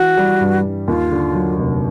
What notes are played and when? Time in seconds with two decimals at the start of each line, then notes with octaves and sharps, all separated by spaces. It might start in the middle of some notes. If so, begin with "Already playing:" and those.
Already playing: E3 F#4
0.17 G3
0.41 G2
0.64 G2
0.88 D#2 F4
1.11 D3
1.35 F#3
1.58 F1